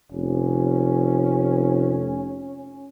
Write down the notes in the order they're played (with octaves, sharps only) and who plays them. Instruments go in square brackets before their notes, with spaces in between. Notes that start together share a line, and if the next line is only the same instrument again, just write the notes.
[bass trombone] F1 [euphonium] C#4